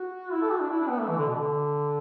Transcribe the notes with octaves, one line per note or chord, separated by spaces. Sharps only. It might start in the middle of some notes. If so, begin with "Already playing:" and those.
Already playing: F#4
E4
A4
F#4
D4
E4
D4
B3
A3
E3
D3
B2
D3